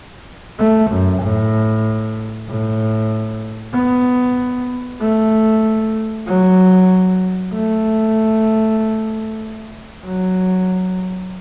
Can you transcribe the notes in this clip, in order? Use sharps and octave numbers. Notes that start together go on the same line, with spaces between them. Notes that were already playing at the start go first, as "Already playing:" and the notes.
A3
F#2
A2
A2
B3
A3
F#3
A3
F#3